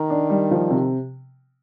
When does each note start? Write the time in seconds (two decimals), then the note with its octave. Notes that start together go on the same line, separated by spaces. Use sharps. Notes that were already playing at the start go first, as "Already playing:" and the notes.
Already playing: D#3 A#4
0.10 D4
0.30 G3
0.51 F3
0.70 C3